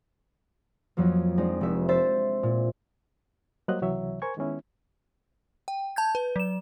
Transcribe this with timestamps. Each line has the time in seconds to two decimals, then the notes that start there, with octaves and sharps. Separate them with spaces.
0.97 F2 F3 F#3 A#3
1.38 G#3 C4 D4 D#4
1.61 F1 E5
1.89 C5 E5 A6
2.43 A#2
3.68 F#3 G3 A#3 C5 D#5 F#6
3.81 C#2 C3 E3 F#3 C#5 E5
4.22 A#4 C5 G#5 C#6 G#6
4.37 D#3 G#3 B3 C#4 E4
5.68 G5
5.96 A5 G6 G#6
6.15 B4
6.36 F#3 E7